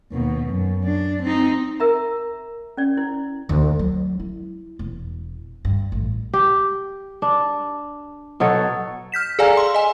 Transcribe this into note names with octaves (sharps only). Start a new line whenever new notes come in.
D#2 B2
F#2
D4
C4 D#4
A#4 E5 A#5
C#4 D5
E4
D2
F#3
E4
E1
G2
A1
G4
D4
B2 F#3 A4 C#5
F6 G6 B6 E7
G#4 A4 D5 F5 G#5 A#5
C6
D#5 G#5